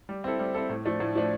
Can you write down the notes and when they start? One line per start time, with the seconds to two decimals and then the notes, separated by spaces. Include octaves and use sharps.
0.09 G3
0.24 C4 E4 A4
0.39 G3
0.54 C4 E4 A4
0.70 A2
0.85 F3 A3 D4
1.00 A2
1.15 F3 A3 D4